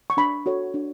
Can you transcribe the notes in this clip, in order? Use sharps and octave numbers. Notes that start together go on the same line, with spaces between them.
C#6
D4 B5
F#4 A4 C#5
D4